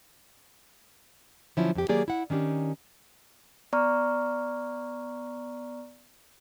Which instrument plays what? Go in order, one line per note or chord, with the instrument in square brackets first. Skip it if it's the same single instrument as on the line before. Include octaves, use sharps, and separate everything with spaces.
[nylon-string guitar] D3 F3 F#3 C#4 E4
F2 G4
D#3 F#3 A#3 G4 G#4 D5
E4 F#5
D#3 C#4 D4 G4
[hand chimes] B3 D5 A#5 C#6 F6